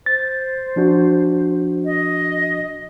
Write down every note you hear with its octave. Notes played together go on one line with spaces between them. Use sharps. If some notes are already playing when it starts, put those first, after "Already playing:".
C5 A6
F3 D4 F#4
D#5